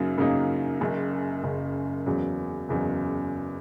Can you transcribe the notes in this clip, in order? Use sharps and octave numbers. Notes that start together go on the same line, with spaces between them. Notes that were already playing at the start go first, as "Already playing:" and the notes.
Already playing: F#2 C#3 F#3 A#3 D#4
F#2 C#3 F#3 A#3 D#4
F#1 F#2 C#3
F#1 F#2 C#3
F#1 E2 C#3 F#3
F#1 E2 C#3 F#3